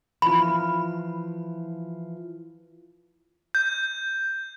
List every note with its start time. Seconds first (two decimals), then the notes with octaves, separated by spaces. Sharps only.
0.22 E3 F3 F4 B5
3.55 G6